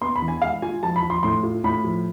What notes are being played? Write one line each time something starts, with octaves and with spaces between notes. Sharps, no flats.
B3 C6
B5
E3
G#5
G#3 F5
F4 G#5
F3 A5
B5
F3
C6
A2 C6
F4
A2 B5
F3